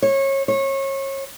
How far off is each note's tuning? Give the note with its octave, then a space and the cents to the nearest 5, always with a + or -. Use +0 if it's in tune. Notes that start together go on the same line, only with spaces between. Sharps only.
C#5 -25
C#5 -30